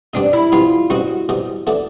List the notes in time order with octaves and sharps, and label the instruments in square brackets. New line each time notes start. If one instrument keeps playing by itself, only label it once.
[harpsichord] B2 G3 C4 D#4 [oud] D4
[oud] E4
[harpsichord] B2 G3 C4 D#4 [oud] F4
[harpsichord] B2 G3 C4 D#4 [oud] F#4
[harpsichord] B2 G3 C4 D#4
B3 E4 A4 D5